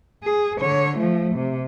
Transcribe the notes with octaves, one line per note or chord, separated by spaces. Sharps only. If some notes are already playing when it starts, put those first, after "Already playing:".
G#4
D3 C#5
F3 A3
C3